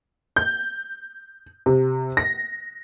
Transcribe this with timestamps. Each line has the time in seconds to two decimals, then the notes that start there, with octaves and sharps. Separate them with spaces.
0.36 G6
1.66 C3
2.17 A#6